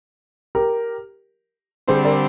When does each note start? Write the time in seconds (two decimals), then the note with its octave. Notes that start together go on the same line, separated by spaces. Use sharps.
0.55 G4 A#4
1.88 D3 G3 C4 G#4 C5
2.05 A#4 D5